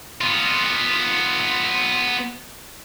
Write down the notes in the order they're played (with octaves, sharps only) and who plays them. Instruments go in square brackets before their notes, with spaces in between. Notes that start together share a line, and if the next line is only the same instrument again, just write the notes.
[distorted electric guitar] B3 F4